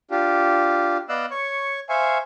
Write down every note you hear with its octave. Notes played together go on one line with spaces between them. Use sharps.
D4 F4 G4
B3 D5 D#5 F5 E6 F#6
C#5 C#6
C5 E5 F5 G#5 C#6